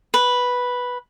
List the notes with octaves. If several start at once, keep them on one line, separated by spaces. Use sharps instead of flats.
B4